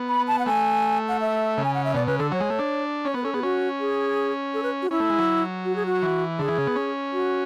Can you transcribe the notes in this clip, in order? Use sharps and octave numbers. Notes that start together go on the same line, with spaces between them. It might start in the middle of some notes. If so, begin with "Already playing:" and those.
Already playing: B3
B5
A5
F#5
A3 G#5
F#5
E5
C#3
G#5
F#5
E5
B2 D5
C#3 B4
D3 A4
F#3 C#5
G#3
A3
D4
C#4 C#5
B3 B4
C#4 A4
B3 G#4
C#4 F#4
G#4
A4
B4
F#4
C#4 E4
A3
G#3
F#3
F#4
G#4
F#4
E3
D3 G#4
E3
C#3
B3
C#4
F#4